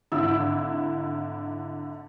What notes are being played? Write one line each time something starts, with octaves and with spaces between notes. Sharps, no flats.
G#1 D3 E4 E6